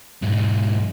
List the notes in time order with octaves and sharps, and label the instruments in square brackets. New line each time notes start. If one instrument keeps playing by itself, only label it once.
[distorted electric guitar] B1 G#2